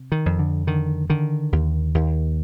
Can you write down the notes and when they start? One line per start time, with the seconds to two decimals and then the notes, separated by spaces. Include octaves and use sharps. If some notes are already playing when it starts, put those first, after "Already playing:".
Already playing: C3
0.12 D#3
0.26 F2
0.39 D3
0.67 D3 D#3
1.10 D3 D#3
1.52 D#2
1.95 D#2